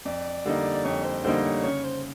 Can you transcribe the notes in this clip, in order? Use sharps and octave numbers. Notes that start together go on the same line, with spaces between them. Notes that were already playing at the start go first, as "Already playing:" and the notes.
F2 D5
D3 G3 A#3 D#4
D5
F2 C#5
C5
D3 G3 A#3 D#4 C5
C#5
C#3 C#5
C5